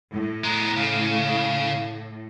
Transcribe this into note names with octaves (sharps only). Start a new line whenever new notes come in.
A2
G#3 B3 A#5
C#3 F5